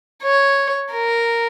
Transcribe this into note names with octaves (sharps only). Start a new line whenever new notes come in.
C#5
A#4